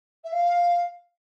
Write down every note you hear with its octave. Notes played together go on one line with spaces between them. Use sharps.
E5
F5